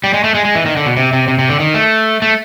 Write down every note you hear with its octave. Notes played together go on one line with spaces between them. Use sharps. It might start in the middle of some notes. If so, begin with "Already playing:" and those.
G3
G#3
A3
G#3
G#3
E3
D#3
D3
B2
C3
C3
C3
C3
D3
D#3
A3
A3